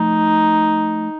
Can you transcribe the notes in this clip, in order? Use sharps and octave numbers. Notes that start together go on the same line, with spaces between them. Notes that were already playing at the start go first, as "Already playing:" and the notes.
Already playing: F3 A3 D#4